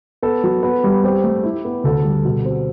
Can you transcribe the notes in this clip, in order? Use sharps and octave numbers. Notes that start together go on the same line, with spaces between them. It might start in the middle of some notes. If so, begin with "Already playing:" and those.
B3 A4
F#3
B3
G3
C4 G4
A3
E4
B3
D2 A4
G3
B2
C4